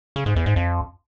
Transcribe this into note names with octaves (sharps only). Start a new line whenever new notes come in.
C#3
G#2
E2
G#2
F2